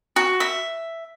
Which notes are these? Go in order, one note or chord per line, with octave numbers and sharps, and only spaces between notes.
F#4
E5